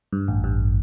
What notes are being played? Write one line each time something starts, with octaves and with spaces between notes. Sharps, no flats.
G2
A1
G2